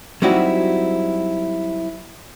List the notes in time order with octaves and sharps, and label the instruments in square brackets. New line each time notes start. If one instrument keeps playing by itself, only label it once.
[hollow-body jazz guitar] F#3 G3 C4 D#4 E4 F#4